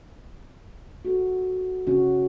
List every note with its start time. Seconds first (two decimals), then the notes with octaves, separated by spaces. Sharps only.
1.05 F#4 A4
1.87 C#3 C#4 F#4